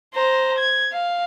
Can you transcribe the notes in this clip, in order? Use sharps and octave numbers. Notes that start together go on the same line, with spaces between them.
C5 A#5
G#6
F5